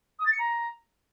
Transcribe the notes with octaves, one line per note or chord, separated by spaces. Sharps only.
D#6
A6
C#7
A#5